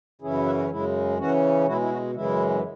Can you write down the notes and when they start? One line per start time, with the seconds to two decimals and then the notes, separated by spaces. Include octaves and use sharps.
0.21 F#2 C#3 E3 C#4 E4 G#4
0.33 F#4
0.46 B4 E5
0.58 F#4
0.69 F#2 C#3 G#3 E4
1.18 C#3 E3 C#4 F#4
1.66 B2 G#3 E4 F#4
1.81 E4
1.90 F#4
2.14 F#2 C#3 E3 G#3 E4